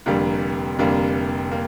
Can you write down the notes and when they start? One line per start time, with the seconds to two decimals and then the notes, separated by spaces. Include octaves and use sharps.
0.06 F1 F2 D3 G3 A#3
0.79 F1 F2 D3 G3 A#3
1.51 A#3